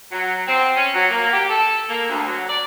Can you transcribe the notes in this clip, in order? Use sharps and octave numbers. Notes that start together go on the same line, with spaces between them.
F#3
C4
C#4
F#3
A#3
G4
A4
A#3
D2
F#3
D5